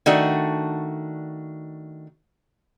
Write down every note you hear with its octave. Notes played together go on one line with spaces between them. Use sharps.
D#3 A3 D4 F#4